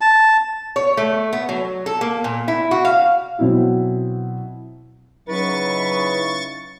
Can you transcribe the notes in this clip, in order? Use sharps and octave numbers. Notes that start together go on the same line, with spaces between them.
A5
C#5
A3
B3
F#3
A4
A#3
A#2
E4
F#4
F5
B2 F#3 C4 E4 F#4
C#3 F#3 D#4 E4 B4 C#6 A6